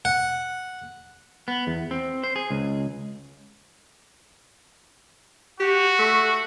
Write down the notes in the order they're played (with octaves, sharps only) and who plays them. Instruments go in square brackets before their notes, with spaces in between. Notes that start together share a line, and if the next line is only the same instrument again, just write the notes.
[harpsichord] F#5
[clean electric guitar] B3
E2
C4
C5
G#4
C#2
[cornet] F#4 [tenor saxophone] G4
[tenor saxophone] A3